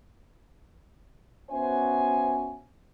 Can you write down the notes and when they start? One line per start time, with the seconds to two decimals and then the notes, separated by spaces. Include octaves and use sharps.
1.51 B3 C#4 F#4 C5 E5 G#5